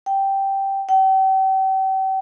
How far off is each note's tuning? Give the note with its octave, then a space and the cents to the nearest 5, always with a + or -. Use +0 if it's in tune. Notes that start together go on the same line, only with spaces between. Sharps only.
G5 -5
G5 -40